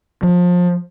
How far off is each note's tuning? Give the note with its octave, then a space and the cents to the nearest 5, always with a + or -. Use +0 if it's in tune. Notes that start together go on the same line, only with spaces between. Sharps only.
F3 +25